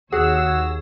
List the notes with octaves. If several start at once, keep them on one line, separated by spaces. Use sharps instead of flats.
D#2 F#4 G#4 C#5 E6